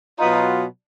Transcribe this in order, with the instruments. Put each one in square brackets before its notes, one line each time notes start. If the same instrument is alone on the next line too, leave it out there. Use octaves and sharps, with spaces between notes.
[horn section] B2 F#3 B3 F4 [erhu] D#4